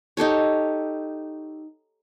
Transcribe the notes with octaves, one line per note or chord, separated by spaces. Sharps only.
D#4 G4 A4 C#5